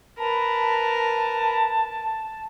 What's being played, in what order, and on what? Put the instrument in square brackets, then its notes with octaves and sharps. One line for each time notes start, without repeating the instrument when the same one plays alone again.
[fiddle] A#4 B4 [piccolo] A5